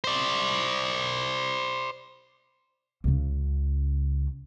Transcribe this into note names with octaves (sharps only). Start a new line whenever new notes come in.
C5 D5
C#2 C#3